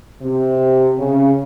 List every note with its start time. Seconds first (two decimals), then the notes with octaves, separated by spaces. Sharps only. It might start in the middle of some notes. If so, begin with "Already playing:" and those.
0.22 C3
0.99 C#3